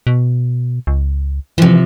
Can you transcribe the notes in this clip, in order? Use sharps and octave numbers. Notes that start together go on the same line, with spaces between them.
B2
C#2
C3 E3 F3